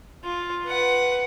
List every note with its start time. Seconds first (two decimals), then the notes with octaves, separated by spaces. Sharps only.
0.24 F4
0.65 B4 F#5